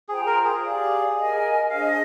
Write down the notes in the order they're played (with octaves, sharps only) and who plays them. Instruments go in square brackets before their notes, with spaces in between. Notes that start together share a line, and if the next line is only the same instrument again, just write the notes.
[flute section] F4 C5 G5 A#5 [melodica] G#4
[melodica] A#4
G#4
[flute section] G4 D5 F5
A#4 D#5 G#5
[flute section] D4 G#4 C5 D#5 [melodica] F5